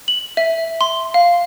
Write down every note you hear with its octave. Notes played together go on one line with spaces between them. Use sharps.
F#7
E5
C6
F5